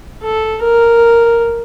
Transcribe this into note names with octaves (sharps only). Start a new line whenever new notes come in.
A4
A#4